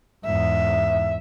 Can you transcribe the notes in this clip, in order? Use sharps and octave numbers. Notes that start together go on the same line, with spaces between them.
E2 G#2 E5